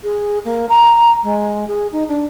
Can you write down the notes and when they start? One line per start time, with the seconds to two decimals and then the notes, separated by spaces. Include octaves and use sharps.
0.04 G#4
0.44 A#3
0.69 A#5
1.23 G#3
1.67 G#4
1.92 D#4
2.08 D4